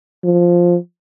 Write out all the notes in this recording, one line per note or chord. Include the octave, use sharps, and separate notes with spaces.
F3